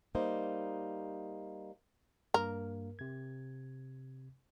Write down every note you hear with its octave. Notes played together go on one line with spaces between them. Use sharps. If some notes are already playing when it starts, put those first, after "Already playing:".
G3 A#3 D#4 C5
G2 A#3 A#4
C3 G#6